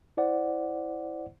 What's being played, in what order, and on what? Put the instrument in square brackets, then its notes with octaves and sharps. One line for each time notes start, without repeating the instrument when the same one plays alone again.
[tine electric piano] E4 C5 D5 F#5